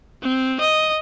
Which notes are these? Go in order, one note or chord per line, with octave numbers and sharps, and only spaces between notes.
C4
D#5